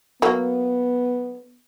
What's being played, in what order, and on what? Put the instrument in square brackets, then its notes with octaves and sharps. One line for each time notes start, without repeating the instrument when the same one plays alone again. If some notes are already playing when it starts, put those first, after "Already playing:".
[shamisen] F#3 A#3 [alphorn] B3